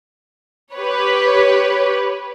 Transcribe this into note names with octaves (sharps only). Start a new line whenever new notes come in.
G4 B4 C#5